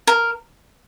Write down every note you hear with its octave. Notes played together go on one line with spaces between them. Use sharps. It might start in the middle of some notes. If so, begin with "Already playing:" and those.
A#4